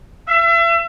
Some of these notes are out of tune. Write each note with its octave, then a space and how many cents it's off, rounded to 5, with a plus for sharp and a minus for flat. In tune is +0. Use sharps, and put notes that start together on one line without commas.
E5 +35